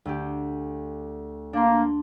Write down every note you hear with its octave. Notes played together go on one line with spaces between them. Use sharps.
D2 A3 G4
A#3 D4 C6